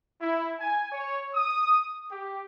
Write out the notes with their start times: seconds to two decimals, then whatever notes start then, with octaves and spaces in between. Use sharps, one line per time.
0.20 E4
0.60 G#5
0.92 C#5
1.34 D#6
2.11 G4